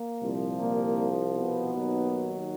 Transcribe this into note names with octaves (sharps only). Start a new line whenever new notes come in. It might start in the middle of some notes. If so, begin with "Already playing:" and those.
Already playing: A#3
C2 A#2 F3
A#2 A#3
B2 B3
D#2 D#3 F#3